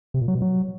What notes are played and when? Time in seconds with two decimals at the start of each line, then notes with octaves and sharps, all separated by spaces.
0.14 C3
0.21 A#2
0.28 F#3
0.35 B2
0.42 F#3